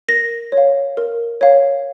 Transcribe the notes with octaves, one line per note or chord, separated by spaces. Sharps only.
A#4 A#6
C#5
F5
A#4
C#5 F5